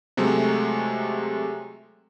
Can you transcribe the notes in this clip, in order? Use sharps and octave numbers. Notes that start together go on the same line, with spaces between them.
C3 F#3 G#3 A3